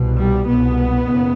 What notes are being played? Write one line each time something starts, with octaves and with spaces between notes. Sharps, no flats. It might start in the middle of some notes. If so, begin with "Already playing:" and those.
Already playing: C2 B2
G3
C2 B2 B3
F#1